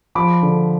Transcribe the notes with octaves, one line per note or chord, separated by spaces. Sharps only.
F3 B5 D6
D3